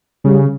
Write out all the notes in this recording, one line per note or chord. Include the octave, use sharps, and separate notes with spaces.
C#3 G3